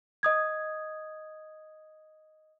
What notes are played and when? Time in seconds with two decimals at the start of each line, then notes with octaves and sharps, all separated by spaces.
0.23 D#5 D#6 G#6